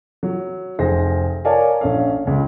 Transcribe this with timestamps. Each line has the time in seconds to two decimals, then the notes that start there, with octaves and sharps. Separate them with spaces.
0.23 F#3
0.79 F1 G#4 C5 A#6
1.45 A#4 C#5 D5 F5 G#5 A5
1.81 A#1 C#4 A4 F5
2.25 C#2 C#3